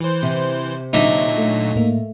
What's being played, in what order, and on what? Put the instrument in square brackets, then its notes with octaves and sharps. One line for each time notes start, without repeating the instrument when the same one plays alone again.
[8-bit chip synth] E3 C5
[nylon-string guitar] C3
[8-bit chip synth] A#2 D3 F#3 [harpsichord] D#4 D5 E5
[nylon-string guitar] A3
[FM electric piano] A2 A#3